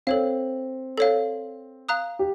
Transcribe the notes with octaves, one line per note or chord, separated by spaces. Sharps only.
C4 A4 C#5 F5
A4 C#5 F5
F5 A#5 D#6 F#6
G4